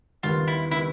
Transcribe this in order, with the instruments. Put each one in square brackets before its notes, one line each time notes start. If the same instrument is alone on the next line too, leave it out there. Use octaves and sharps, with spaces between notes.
[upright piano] D#2 D#3 G3 B3 [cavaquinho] F4
[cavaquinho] E4
[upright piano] D#3 G3 B3 [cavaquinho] E4